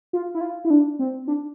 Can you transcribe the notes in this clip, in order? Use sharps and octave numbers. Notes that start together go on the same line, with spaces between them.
F4
E4
F4
E4
D4
C4
D4